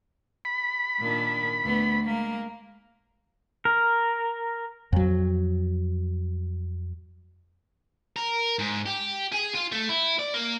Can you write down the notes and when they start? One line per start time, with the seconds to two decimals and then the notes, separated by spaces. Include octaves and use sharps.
0.45 B5
0.99 A#2 D#3 D4
1.63 D2 B3
2.05 G#3 A#3
3.65 A#4
4.93 F2 F#3
8.16 A#4
8.59 G#2
8.86 G4
9.33 G#4
9.55 F4
9.72 A3
9.89 E4
10.19 D5
10.34 A#3